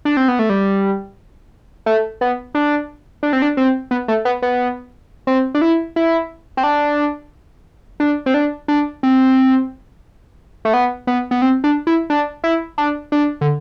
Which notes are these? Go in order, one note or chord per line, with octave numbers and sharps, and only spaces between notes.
D4
C4
B3
A3
G3
A3
B3
D4
D4
C4
D4
C4
B3
A3
B3
B3
C4
D4
E4
E4
C4
D4
D4
C4
D4
D4
C4
A3
B3
B3
B3
C4
D4
E4
D4
E4
D4
D4
D3